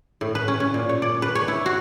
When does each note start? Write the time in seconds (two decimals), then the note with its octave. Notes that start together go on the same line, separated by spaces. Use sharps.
0.21 A2
0.35 B4
0.48 C#4
0.60 C#4
0.74 A#2
0.89 C#5
1.02 D5
1.22 B4
1.35 C#5
1.48 E4
1.66 F#4